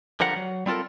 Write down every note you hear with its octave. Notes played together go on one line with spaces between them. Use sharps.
D3 F3 G3 A#4 F#5
F#3
G3 C4 F4 A4 A#4